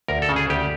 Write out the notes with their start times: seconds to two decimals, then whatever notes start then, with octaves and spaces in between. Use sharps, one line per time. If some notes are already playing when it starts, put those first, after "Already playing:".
0.08 D2 A#4
0.22 A4
0.29 C#3
0.36 G#4
0.50 D2 G4